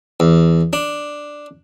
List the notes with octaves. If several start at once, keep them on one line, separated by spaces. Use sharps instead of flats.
E2
D4